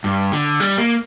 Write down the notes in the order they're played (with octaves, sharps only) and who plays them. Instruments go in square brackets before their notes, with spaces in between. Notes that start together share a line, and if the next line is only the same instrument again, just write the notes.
[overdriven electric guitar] G2
D3
G3
A#3